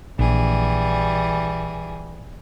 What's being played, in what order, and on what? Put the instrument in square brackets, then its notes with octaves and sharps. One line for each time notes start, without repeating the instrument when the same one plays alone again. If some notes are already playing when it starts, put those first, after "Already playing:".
[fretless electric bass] A#1 [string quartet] E3 G3 G#4